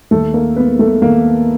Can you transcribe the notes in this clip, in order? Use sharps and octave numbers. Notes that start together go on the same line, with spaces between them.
D#2 A3 A4
A#3 A#4
G#3 B3 B4
A3 A4
D#2 A#3 A#4